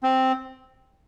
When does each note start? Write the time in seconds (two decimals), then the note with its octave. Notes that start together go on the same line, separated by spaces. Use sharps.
0.03 C4